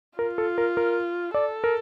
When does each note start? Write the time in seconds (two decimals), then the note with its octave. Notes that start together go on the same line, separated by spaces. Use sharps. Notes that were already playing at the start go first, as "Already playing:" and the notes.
0.18 F4 A#4
0.38 A4
0.58 A#4
0.77 A#4
1.34 A4 D5
1.64 A#4